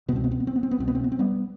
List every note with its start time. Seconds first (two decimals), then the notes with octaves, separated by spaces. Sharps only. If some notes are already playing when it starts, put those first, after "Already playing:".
0.08 B2 B3
0.12 C2 C4
0.24 B3
0.31 C4
0.40 B3
0.47 C4
0.56 B3
0.63 C4
0.71 B3
0.79 C2 B2 C4
0.88 B3
0.95 C4
1.04 B3
1.12 C4
1.19 G3 B3